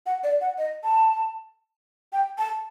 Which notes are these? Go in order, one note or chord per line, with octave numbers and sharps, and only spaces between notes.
F#5
D5
F#5
D#5
A5
G5
A5